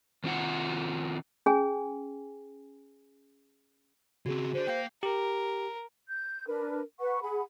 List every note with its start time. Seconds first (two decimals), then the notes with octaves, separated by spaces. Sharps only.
0.24 D#3 C4 F4 F#5
1.46 C#4 G#4 G#5
4.26 C#3 C4 F#4 G#4
4.54 D3 D4 C5
4.67 A#3 F5 G5 G6 C7
5.03 G4 A#4
6.09 G6
6.47 D4 A#4 B4
6.99 B4 F#5 C#6
7.22 G#4 F#5 B5